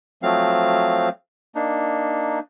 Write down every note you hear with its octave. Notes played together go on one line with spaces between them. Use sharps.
F3 F#3 A3 C4 F5
A#3 D4 D#4